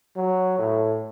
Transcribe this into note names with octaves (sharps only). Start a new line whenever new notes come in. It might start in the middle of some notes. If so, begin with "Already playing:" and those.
F#3
A2